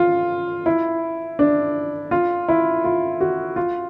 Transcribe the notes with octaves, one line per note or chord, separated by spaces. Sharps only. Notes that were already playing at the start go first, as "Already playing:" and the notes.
Already playing: F4
E4
D4
F4
E4
F4
F#4
F4